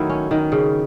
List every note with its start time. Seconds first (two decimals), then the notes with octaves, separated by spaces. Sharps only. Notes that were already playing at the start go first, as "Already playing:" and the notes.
Already playing: D#3 F#3 A3 E4
0.09 C#4
0.31 D#3
0.52 C#3